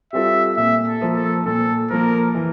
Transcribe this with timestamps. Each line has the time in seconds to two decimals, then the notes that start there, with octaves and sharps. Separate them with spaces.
0.13 G3 C4 F4 A4 E5
0.57 A#2 E5
0.87 A4
1.01 F3 A#3
1.16 A4
1.46 A#2 A4
1.90 F3 A#3 A#4
2.34 E3